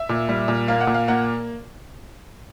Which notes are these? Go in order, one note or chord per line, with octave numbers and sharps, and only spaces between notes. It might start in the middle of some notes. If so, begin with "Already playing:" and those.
Already playing: E5
A#2
G3
A#2
A#3 F5
F#5
A#2
F5
A#3 F#5